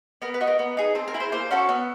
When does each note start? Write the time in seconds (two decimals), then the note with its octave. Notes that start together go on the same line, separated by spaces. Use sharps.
0.22 B3 A#4
0.34 B4
0.41 D#4 F#4
0.47 A#4
0.59 B3
0.77 D#4 G#4
0.95 C4 A4
1.08 A#4
1.14 E4 G#4
1.20 C5
1.32 A#3 C5
1.51 C#4 F#4 A4
1.69 B3